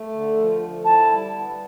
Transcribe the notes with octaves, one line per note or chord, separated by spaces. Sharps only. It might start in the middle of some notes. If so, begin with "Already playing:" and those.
Already playing: A3
D3
F3
D3
E4 A5
G3
B3